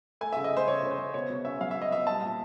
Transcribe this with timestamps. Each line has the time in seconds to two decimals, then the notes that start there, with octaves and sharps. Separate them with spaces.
0.21 A3 G#5
0.33 C#3 E5
0.44 D#5
0.52 A3 C5
0.68 C#3 C#5
0.83 C#3
0.91 C5
0.98 C#3
1.14 B2 C#5
1.30 B2
1.45 C#4 E5
1.60 F#3 F5
1.71 F#3 E5
1.82 D#5
1.91 B2 E5
2.06 G3 A5
2.22 A#2